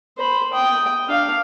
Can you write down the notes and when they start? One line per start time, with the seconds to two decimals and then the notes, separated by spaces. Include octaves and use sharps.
0.18 C5 B5
0.53 G5 D#6
1.08 D4 F5